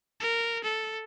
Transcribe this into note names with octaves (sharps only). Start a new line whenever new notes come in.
A#4
A4